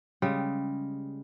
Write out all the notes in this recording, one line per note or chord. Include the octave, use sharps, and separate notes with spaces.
C#3 G3 G#3